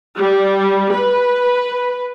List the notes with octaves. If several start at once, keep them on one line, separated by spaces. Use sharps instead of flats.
G3
B4